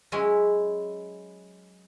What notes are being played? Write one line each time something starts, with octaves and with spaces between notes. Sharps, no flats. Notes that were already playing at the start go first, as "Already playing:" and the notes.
F#3 G#3 C#4 E4